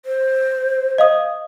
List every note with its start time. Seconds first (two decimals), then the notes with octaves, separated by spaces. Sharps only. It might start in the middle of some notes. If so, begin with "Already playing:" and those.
0.06 C5
0.98 D#5 F5 D#6